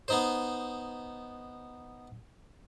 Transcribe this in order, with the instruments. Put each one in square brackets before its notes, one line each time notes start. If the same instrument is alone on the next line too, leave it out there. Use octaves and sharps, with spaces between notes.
[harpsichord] B3 D#4 C5